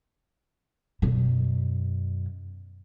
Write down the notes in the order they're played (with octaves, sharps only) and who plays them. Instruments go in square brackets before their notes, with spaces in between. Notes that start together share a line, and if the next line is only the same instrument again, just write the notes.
[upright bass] F#2 B2